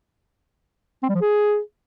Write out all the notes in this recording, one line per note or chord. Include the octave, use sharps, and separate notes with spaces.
C4
G3
F3
G#4